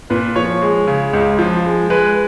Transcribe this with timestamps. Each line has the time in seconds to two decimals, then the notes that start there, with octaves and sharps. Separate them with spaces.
0.10 A#2 B4
0.36 F3 C#5
0.62 G#3
0.87 C#3
1.13 C#2
1.39 F3
1.65 G#3
1.90 G#3 B4